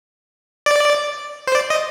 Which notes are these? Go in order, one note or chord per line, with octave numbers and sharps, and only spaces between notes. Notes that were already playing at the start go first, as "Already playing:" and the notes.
D5
C5
D5
D#5